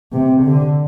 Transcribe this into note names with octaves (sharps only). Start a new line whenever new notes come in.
C3
D3